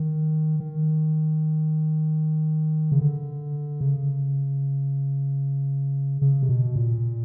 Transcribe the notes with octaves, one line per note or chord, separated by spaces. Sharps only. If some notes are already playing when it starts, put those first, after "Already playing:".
Already playing: D#3
D#3
C#3
D3
C#3
C#3
C3
B2
A#2